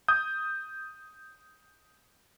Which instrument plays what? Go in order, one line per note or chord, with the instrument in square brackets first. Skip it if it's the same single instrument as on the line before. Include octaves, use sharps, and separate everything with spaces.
[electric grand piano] D#6 G6